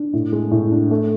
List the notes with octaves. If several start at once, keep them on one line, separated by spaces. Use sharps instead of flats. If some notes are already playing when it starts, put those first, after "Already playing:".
Already playing: D4
A2
G#3
A2
D4
A3